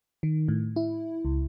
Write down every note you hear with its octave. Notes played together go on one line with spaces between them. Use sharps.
D#3
A2
E4
C#2